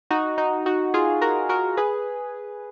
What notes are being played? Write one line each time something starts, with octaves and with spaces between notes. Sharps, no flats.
D#4 F#4
D#4 F#4
D#4 F#4
F4 G#4
F#4 A#4
F#4 A#4
G#4 B4